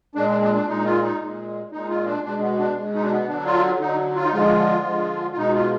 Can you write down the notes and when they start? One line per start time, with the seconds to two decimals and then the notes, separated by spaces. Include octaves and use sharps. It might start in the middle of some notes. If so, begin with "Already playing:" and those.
0.15 A#2 G#3 D4
0.29 D4
0.42 D4
0.55 D4
0.68 A#2 G#3 D#4
0.85 F4
1.03 D#4
1.20 A#2 G#3
1.72 A#2 G#3 D#4
1.89 F4
2.06 D4
2.24 B2 G#3 D4
2.42 B3
2.59 D4
2.77 B2 G#3
2.94 D#4
3.03 D4
3.11 B3
3.28 D3 F#3 D4
3.46 F4
3.80 D3 F#3 D#4
4.16 F4
4.25 D#4
4.33 D3 F3 G#3 F4
4.85 D3 F3 G#3
5.33 F4
5.36 B2 G#3 D#4
5.54 F4